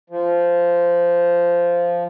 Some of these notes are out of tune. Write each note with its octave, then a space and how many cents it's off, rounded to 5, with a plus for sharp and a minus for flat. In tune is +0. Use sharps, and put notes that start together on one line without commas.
F3 -10